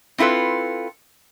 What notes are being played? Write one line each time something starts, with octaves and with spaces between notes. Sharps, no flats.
C4 E4 F4 A4 B4